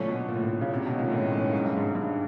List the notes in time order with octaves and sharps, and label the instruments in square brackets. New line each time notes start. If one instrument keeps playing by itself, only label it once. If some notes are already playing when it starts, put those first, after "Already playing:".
Already playing: [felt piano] A#2 [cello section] D3 F#3 A3 C#4
[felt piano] B2
A#2
A2
A#2
C#3
[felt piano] C3 [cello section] D#3 G#3 C#4
[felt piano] B2
A#2
A2
A2
G#2
G2
G#2
G2